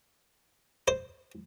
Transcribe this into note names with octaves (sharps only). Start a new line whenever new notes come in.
C5